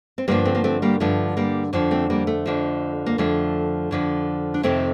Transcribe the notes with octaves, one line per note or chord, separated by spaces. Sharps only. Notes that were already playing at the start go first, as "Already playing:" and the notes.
C4
G2 D3 F3 G3 A#3
A3 C4
A#3
A3 C4
G3 A#3
G2 D3 F3 A3
G3 A#3
F2 D3 F3
A3 C4
G3 A#3
A3
F2 D3 F3
A#3
F2 D3 F3 A3
F2 D3 F3
D4
F2 C3 D#3 A3 C4